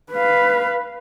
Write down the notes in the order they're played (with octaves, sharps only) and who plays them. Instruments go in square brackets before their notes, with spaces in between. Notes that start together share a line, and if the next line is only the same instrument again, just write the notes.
[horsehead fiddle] B4 F5